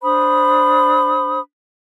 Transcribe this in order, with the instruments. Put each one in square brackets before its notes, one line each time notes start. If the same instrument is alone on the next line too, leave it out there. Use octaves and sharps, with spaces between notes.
[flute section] D4 C5 B5 D#6